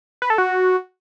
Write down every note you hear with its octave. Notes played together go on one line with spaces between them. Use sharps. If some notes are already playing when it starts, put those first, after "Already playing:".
B4
A4
F#4